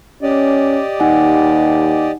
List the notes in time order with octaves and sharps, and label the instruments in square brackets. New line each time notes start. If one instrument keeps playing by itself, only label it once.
[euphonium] C#4 [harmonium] G4 D5 D#5
[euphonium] D#2 [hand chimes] D#4 F#5 G#5